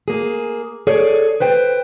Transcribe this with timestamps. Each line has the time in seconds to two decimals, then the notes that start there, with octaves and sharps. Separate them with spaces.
0.08 A#3 G#4
0.87 G#4 A4 C#5 D5
1.40 B4 C5 G5